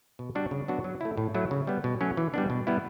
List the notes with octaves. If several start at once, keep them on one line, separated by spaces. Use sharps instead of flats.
B2
G3 D4 F#4
C#3
F#3 B3 D4 F#4
F#3
A3 E4
A2
F#3 A3 E4
C#3
G3 B3
B2
F#3 A3 C#4
E3
G3 B3 D4
B2
G3 B3 E4